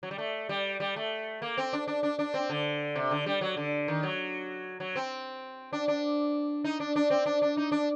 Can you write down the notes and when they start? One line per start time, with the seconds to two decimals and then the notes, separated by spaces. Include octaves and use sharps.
0.03 F#3
0.11 G3
0.18 A3
0.49 G3
0.80 G3
0.96 A3
1.42 A#3
1.57 C4
1.73 D4
1.88 D4
2.03 D4
2.19 D4
2.34 C4
2.50 D3
2.96 C3
3.11 D3
3.26 G3
3.41 F#3
3.57 D3
3.88 D#3
4.03 F#3
4.80 F#3
4.96 C4
5.73 D4
5.88 D4
6.64 D#4
6.80 D4
6.96 D4
7.10 C4
7.26 D4
7.42 D4
7.57 D#4
7.72 D4